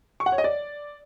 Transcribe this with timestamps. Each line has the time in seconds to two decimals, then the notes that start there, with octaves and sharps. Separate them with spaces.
0.20 C#6
0.26 F#5
0.32 C#5
0.38 D#5
0.44 D5